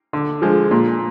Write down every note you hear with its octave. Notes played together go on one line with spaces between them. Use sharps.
D3
F3 G#3
A#2